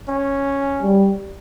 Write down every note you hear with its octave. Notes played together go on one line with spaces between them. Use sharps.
C#4
G3